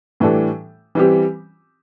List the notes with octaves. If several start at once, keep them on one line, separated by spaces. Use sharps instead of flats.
A2 E3 G3 D4 A4
E3 G3 C4 G4